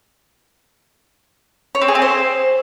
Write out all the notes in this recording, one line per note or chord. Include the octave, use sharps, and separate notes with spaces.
C#5
C4
G#4
C4
C5